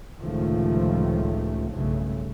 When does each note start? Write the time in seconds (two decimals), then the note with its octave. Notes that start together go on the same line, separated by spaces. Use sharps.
0.20 C#2 A2 C3 D#3 F3 A3
1.71 B1 G2 C#3 A3